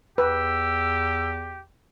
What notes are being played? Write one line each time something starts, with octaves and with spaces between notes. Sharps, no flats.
E2 G4 B4 E6